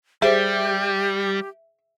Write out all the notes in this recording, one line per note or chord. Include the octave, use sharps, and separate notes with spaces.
G3 G4 G#4 C5 E5